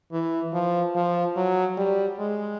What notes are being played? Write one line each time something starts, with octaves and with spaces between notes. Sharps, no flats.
E3
F3
F3
F#3
G3
G#3